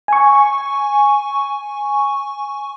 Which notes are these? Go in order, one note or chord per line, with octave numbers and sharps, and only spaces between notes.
G#5 C#6